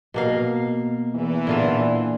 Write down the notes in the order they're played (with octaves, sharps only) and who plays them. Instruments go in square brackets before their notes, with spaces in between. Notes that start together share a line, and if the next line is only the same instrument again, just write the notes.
[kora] B2 A#3 F5
[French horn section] E2 E3
[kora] A#2 D3 F4